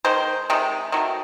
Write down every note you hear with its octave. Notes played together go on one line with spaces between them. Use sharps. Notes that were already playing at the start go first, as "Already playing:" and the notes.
D#3 G#3 C5
C3 D#3 G#3
D#3 F#3 A3